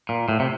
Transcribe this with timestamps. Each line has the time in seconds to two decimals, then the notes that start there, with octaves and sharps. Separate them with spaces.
0.09 A#2
0.29 A2
0.40 C3